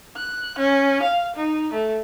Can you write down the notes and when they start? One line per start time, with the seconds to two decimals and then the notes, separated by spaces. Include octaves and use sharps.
0.16 F#6
0.58 C#4
1.02 F5
1.36 D#4
1.73 A3